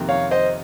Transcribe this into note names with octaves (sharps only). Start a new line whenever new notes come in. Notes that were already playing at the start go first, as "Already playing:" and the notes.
Already playing: F2 C3 D#3 A#3
C#5 F5
C5 D#5